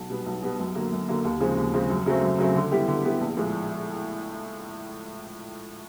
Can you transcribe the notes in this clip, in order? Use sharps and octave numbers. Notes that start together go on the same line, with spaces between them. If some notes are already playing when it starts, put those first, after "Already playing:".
Already playing: B1
B2 G3 B3
B1
B2 G3 B3
F#2
D3 F#3 A#3
F#2
D3 F#3 A#3
D#2
C#3 F3 G#3 C4
D#2
C#3 F3 G#3 C4
F#2
C#3 F#3 A3 C4
F#2
C#3 F#3 A3 C4
D3
G3 B3 E4 G4
D3
G3 B3 E4 G4
A#1
A2 F3 G#3